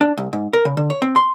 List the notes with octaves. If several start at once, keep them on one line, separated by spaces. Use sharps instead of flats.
D4
C2
G#2
A#4
C#3
D3
C#5
C4
C6